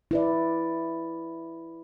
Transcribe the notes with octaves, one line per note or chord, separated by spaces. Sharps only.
E4 B4 D5